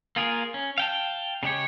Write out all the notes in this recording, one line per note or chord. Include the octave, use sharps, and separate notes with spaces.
A#3 F4 G#4 A#4
C#4
F5 G5 A5
C#3 G#3 G4 C#5